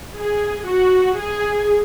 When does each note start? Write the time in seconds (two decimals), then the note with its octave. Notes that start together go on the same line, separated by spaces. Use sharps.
0.17 G#4
0.67 F#4
1.17 G#4